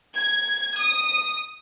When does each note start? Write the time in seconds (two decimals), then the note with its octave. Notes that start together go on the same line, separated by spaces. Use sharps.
0.15 G#6
0.77 D#6